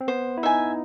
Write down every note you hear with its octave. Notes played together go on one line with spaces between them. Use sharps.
C4
B3 C5
E4
D#4 E5 G#5